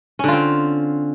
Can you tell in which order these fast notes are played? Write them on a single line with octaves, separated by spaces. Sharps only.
C#4 D3 F4 C4